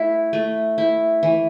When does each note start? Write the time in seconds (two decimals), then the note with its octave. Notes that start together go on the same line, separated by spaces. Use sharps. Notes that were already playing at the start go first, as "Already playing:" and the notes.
Already playing: A3 E4
0.33 A3
0.78 E4
1.23 E3